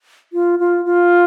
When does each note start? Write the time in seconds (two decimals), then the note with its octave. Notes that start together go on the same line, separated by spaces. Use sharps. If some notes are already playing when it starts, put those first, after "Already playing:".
0.33 F4
0.59 F4
0.85 F4